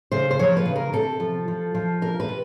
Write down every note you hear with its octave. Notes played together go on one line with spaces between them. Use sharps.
C#3 C5
C5
F3 C#5
B4
C#3
A#4
C3 A4
F3
F3
F3
C3 A#4
B4
C3